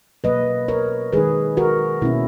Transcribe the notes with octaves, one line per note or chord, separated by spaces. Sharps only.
B2 F#3 A#3 B4 D#5
A#4 C#5
D#3 G#3 D#4 G#4 B4
F#4 A#4
B2 A#3 C#4 E4